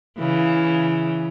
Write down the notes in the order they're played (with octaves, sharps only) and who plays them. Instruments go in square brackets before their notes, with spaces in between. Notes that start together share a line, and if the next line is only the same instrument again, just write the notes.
[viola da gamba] C#3 E3